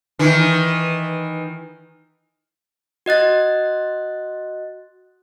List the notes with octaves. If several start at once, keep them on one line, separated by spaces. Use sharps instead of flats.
D#3 E3
F#4 D#5 F#6 A6